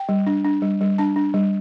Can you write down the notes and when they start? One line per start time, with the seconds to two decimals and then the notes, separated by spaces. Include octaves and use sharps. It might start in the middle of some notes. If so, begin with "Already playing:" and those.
Already playing: G5
0.09 G3
0.27 D4
0.44 D4
0.62 G3
0.81 G3
0.98 D4 A5
1.16 D4
1.34 G3